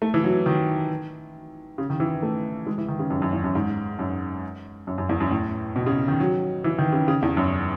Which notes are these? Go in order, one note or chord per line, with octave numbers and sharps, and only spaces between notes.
A3
E3
F#3
D#3
C#3
D#3
E3
A3
G#3
E3
D#3
C#3
F#2
F#2
E2
F#2
G#2
F#2
F#2
F#2
E2
F#2
A2
B2
C#3
D#3
F#3
E3
D#3
C#3
C#3
E2
F#2